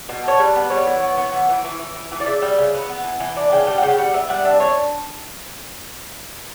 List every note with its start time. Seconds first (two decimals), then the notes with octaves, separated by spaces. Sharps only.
0.09 B2
0.23 A3 C#5
0.40 G3 B4
0.56 B3
0.70 G3 C#5
0.87 E3
1.02 B3
1.17 B3
1.32 E3
1.49 E3
1.65 E3
1.79 E3
1.96 E3
2.12 E3
2.20 D5
2.26 C#3 E5
2.42 G3
2.58 C#3
2.74 B3
2.89 B3
3.04 E3
3.20 E3
3.36 D4
3.52 C#3 G5
3.67 G3 G5
3.78 F#5
3.82 C#3 G5
3.93 G5
3.98 G3 F#5
4.14 B3 E5
4.29 G3 F#5
4.45 D4 E5
4.60 D4 C#5